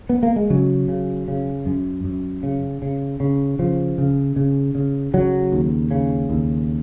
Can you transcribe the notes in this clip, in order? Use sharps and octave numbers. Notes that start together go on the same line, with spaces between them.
B3
A#3
G#3
C#3 F#3
C#3
C#3
F#2
F#2
C#3
C#3
C#3
C#3 F3
C#3
C#3
C#3
C#3 F#3
D#2
C#3
D#2